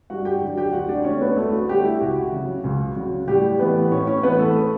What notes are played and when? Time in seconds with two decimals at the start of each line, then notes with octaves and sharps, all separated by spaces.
0.10 G2 F#4 F#5
0.25 G4 G5
0.41 D3 F#3
0.58 G4 G5
0.73 D2 F#4 F#5
0.89 D4 D5
1.05 D3 A3 C#4 C#5
1.21 B3 B4
1.37 D2 A3 A4
1.53 F#4
1.69 D3 G3 A3 G4
1.85 E4
2.01 C#2 F#4
2.32 C#3 F#3
2.64 C#2
2.96 C#3 F#3
3.28 A2 G3 G4
3.59 E3 A3 B3 B4
3.92 A2 C#4 C#5
4.07 C#4 C#5
4.23 E3 A3 B3 B4
4.39 A3 A4